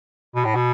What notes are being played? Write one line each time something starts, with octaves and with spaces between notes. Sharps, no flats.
B2
A2
B2